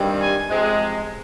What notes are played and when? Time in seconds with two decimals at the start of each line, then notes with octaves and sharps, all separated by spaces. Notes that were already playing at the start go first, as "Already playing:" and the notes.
Already playing: G2 D#3 G3 C4
0.19 G#5
0.49 C3 F3 G#3